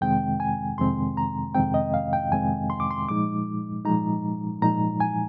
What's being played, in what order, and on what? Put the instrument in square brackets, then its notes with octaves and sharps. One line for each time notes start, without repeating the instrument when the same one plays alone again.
[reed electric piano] F2 C3 D#3 G#3 C4 G5
G#5
F2 C3 D#3 G#3 C4 C6
A#5
F2 C3 D#3 G#3 C4 G5
D#5
F5
G5
F2 C3 D#3 G#3 C4 G#5
C6
D6
C6
A#2 F3 G#3 D#4 D6
A#2 F3 G#3 D#4 A#5
A#2 F3 G#3 D#4 A#5
G#5